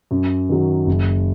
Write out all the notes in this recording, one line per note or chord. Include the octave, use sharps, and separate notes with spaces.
F#2
D#3 F#3
F#1